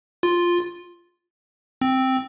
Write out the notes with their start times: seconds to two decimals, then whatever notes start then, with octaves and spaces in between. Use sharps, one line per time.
0.23 F4
1.81 C4